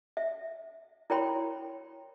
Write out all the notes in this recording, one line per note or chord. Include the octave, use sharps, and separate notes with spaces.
E5
E4 A#4 C#5 G5 B5 C6